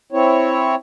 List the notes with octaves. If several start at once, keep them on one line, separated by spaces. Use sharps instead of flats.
C4 E4 C#5